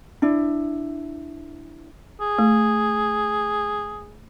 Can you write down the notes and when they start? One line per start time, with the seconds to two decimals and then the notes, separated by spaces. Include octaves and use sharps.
0.22 D4 E4
2.21 G#4
2.38 A3